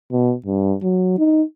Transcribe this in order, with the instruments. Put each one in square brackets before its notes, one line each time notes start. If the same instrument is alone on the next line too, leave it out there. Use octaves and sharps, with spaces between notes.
[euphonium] B2
G2
F#3
D#4